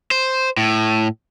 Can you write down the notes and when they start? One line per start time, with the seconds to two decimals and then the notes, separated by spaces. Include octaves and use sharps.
0.11 C5
0.57 A2